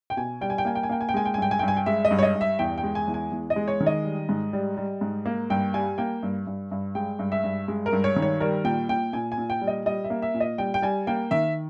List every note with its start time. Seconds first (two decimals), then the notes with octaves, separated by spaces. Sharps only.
0.10 G5
0.17 B2 G#5
0.41 G3 G5
0.50 G#5
0.58 G5
0.65 A#3 G#5
0.75 G5
0.83 G#5
0.89 A#3 G5
1.01 G#5
1.09 G5
1.14 G#3 G#5
1.25 G5
1.34 G#5
1.38 G2 G5
1.51 G#5
1.59 G2 G5
1.68 G#5
1.77 G5
1.86 G#3 E5
2.05 D#5
2.11 G2
2.19 C#5
2.23 D#5
2.35 G2
2.41 E5
2.59 E2 G5
2.78 G5
2.83 G#3
2.95 G#5
3.08 E2
3.14 G#5
3.32 E2
3.50 D#5
3.56 G#3
3.68 C#5
3.80 D#3
3.86 D#5
4.05 G3
4.29 G#2
4.53 G3
4.77 G3
5.01 G#2
5.26 A#3
5.50 G2 G5
5.74 G3 G#5
5.98 A#3 G5
6.23 G2
6.47 G2
6.71 G2
6.95 G#3 G5
7.19 G2
7.32 E5
7.44 G2
7.68 G#3
7.86 A#4
7.93 G2
8.04 C#5
8.16 D#3
8.22 C#5
8.40 G3 A#4
8.64 A#2 G5
8.89 A#2 G5
9.13 A#2 G#5
9.32 G#5
9.38 A#2
9.50 G5
9.61 G3
9.67 D#5
9.86 G3 D#5
10.04 E5
10.10 A#3
10.22 E5
10.34 A#2
10.40 D#5
10.58 G3 G5
10.74 G5
10.82 G3 G#5
11.07 A#3 G5
11.31 D#3 E5